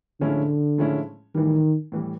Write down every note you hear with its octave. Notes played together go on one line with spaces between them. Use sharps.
A2 D3 F3 G#3 C#4 E4
A2 F3 G#3 C#4 E4
A2 D#3 E3 G3
A2 E3 G3